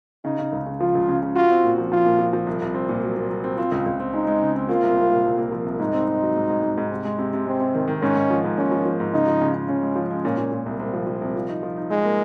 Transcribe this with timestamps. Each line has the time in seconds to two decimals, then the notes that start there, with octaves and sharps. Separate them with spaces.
0.24 C#3 D#4
0.39 C#3
0.52 C#2
0.66 C#3
0.80 F3 F4
0.95 C#2
1.08 C#3
1.22 C#3
1.36 F4 F#4
1.51 C4
1.64 A#2
1.78 F3
1.91 F3 F4
2.06 A#2
2.19 F3
2.33 F3
2.47 C2
2.62 C2
2.74 C4
2.89 A#2
3.03 F#3
3.16 A#2
3.31 F#3
3.44 C4
3.58 C4 F4
3.72 C#2
3.86 C#2
4.00 C4
4.14 G#3 D#4
4.27 G#3
4.42 C#3
4.56 C4
4.69 A#3 F4
4.83 C2
4.96 C2
5.11 A#2
5.25 C2
5.38 A#3
5.52 F3
5.66 C2
5.79 G#2 D#4
5.93 C4
6.08 C4
6.22 F#3
6.36 G#2
6.50 G#2
6.63 G#2
6.77 G#2
6.92 C3
7.05 G#3
7.19 C3
7.33 C3
7.47 G#3 C4
7.60 C3
7.74 D#3
7.88 D#3
8.02 G#2 C#4
8.17 G#2
8.30 F3
8.44 G#2
8.57 A#3 C#4
8.72 F3
8.86 F3
9.00 G#2
9.13 C#3 D#4
9.27 F3
9.41 C#3
9.54 C#3
9.68 C#3 C#4
9.83 G#3
9.96 F3
10.11 G#3
10.25 A#2 C#4
10.38 A#2
10.52 A#2
10.66 C2
10.79 C2 C4
10.93 F3
11.07 F3
11.21 C2
11.36 F3
11.49 D#4
11.63 F3
11.77 D#4
11.90 G#3 D#4
12.05 A#3